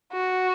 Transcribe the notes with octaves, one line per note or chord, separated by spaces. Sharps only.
F#4